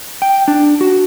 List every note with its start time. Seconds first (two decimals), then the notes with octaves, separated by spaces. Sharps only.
0.22 G5
0.48 D4
0.81 F#4